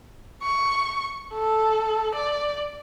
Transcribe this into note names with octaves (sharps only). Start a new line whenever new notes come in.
C#6
A4
D5